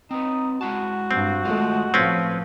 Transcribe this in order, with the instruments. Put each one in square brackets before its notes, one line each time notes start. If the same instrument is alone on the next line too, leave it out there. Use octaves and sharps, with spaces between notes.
[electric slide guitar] C4 B4 [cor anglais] D#4
[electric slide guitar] G#3 E4 A5 [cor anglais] F#4
[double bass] G2 [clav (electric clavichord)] C4
[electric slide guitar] D#3 F3 F4 [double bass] G#3 A3
[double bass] A2 F3 [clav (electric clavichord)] C4 C#4 [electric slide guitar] B4